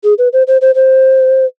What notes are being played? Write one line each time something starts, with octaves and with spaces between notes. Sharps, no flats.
G#4
B4
C5
C5
C5
C5